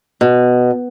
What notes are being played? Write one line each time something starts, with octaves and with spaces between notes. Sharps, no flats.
B2